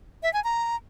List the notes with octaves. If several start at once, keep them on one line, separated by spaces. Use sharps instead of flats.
E5
G#5
A#5